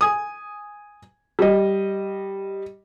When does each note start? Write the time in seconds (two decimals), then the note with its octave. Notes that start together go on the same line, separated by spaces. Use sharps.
0.01 G#5 D#6
1.39 G3 D#5